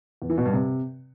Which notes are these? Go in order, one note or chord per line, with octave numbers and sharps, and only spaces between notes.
E2
E3
B2
G2
C3